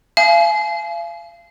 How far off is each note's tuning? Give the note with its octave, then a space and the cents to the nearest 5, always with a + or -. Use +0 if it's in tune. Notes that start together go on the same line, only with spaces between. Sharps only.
F5 -35 G#5 +35